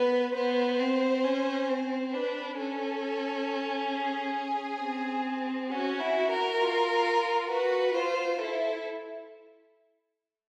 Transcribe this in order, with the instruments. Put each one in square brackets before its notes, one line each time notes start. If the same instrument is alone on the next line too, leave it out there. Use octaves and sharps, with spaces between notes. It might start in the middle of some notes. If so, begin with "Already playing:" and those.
Already playing: [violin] B3 [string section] B4
[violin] B3 [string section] C5
[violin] C4
C#4
C4
[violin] D4 [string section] B4
[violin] C#4 [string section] A4
[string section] G#4
[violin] C4
[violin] C#4 [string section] F#4
[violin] E4
A#4
[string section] F4
[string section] F#4 [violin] B4
[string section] F4 [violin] C5
[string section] E4 [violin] A4